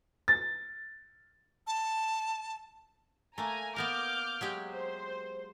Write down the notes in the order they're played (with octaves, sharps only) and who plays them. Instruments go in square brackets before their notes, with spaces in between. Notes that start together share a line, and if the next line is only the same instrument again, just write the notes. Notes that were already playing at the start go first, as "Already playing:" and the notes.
[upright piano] A6
[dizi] A5
[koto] A3 A#3 [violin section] G#5 A#5
[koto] A#3 B3 A#4 [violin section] D6 F6 G6
[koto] F#3 G#3 G4
[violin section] C5